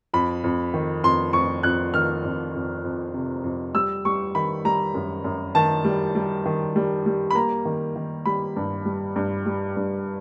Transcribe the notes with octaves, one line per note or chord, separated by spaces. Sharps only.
F2 B5
F2
D#3
F2 C6
F2 C#6
F2 F#6
D#3 F6
F2
F2
F2
C3
F2
G3 E6
G3 C#6
D#3 B5
G3 A#5
F#2
F#2
D#3 A5
G3
G3
D#3
G3
G3
B5
A#3 A#5
D#3
D#3
G3 B5
G2
G3
G2
G3
G2